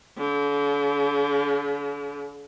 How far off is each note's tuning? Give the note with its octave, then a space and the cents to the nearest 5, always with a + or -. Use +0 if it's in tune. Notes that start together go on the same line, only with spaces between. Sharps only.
D3 -45